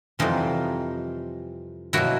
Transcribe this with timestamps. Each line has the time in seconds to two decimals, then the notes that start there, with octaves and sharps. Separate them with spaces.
0.19 F2 C3 E3 G3 D#4 F4
1.93 B2 F#3 A#3 E4 F#4